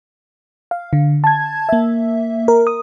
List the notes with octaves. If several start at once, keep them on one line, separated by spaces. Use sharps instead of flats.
F5
D3
A5 G#6
A#3 E5
A#4
D#6